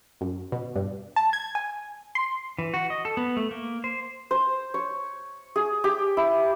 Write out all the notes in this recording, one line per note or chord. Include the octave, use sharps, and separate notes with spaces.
F#2
B2
G2
A5
G#6
G#5
C6
E3
F#4
D#5
A4
B3
A3
A#3
C5
C5
C#5
G#4
G4
E4